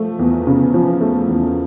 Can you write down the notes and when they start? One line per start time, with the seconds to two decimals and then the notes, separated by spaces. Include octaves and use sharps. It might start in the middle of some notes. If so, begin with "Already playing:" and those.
Already playing: F3 A3
0.19 E2
0.47 C#3
0.74 F3
1.01 A3
1.28 E2